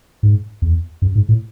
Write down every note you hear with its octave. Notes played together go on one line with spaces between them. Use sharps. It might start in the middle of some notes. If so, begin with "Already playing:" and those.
G#2
E2
F#2
G#2
A2